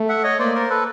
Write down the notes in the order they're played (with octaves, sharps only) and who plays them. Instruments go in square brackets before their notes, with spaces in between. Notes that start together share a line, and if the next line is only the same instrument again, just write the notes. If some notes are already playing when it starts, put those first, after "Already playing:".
Already playing: [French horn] A3
[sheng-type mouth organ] E5 F#5
C#5 D#5
[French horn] A#3 [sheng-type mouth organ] C5 D5
[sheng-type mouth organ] A#4 C5
A4 B4